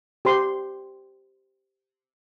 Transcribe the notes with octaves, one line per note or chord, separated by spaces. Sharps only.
G4 C5 C6